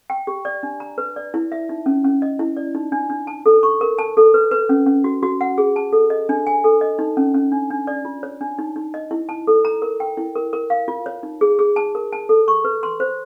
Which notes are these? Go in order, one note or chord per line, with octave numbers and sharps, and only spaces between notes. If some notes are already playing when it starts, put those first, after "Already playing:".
G5
G4
D5
D4
A#5
B4
D5
E4
E5
D#4
C#4
C#4
D#5
E4
D5
D#4
D4
D4
A5
A4
C#6
A#4
A5
A4
B4
B4
C#4
C#4
F#4
F#4
F#5
G#4
A5
A4
D#5
D4
G#5
A4
D#5
D#4
C#4
C#4
D4
D4
D5
F4
C#5
D4
D#4
D#4
D#5
E4
A5
A4
A#5
A#4
G5
E4
A#4
A#4
F5
F4
C#5
D#4
G#4
G#4
A5
A#4
A5
A4
C#6
B4
C6
C5